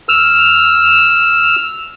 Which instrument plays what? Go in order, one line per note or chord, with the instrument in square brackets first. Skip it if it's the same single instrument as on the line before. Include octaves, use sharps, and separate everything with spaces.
[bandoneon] E6 F6